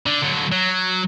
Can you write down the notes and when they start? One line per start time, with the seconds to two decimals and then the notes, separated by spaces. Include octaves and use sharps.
0.06 D3
0.22 D3 F#3
0.52 F#3